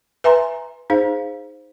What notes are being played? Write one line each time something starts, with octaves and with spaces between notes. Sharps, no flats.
B4 E5 G#5 A#5 C6
D#4 G#4 C5 F5